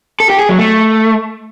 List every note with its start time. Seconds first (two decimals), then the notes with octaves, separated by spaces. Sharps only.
0.20 A4
0.30 G4
0.39 G#4
0.49 F#3
0.59 A3